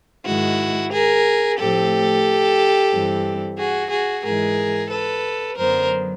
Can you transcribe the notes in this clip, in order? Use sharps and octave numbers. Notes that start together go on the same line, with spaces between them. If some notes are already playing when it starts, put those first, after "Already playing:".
G#2 D#3 G#3 E4 F#4
G#4 A#4
A2 F3 A3 C4 G4 A4
G2 E3 G3 C4
F#4 G#4
F#4 G#4
G#2 E3 G#3 G#4 A#4
A4 B4
F#2 D3 F#3 B3 A#4 C5